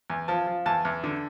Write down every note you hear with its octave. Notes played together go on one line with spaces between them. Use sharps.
E2
F3 A5
F3
E2 A5
E2
D3